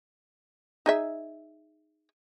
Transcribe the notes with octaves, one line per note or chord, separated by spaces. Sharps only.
D#4 G#4 E5